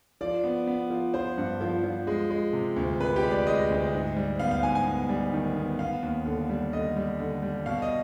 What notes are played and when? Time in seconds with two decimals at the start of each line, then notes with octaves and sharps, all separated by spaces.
0.21 F3 D5
0.44 B3
0.67 B3
0.90 F3
1.14 F3 C5
1.38 G2
1.61 F3
1.84 F3
2.07 G#3
2.30 G#3
2.53 C3
2.76 D2
3.00 C3 B4
3.16 G4
3.23 G#3
3.31 D5
3.47 G#3 D#5
3.70 D2
3.93 G#2
4.17 G3
4.39 B3 F5
4.51 F5
4.63 G#2 G#5
4.75 G#5
4.86 B3
5.09 G3
5.33 D#3
5.57 B3
5.79 B3 F5
6.03 D#2
6.26 D3
6.49 G3
6.73 D3 D#5
6.96 G3
7.19 D3
7.43 G3
7.66 B2 F5
7.82 D#5